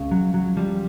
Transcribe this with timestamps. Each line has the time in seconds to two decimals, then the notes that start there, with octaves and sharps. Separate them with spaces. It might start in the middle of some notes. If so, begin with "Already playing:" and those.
Already playing: C#2 C#3
0.11 F#3
0.34 F#3
0.57 F3 G3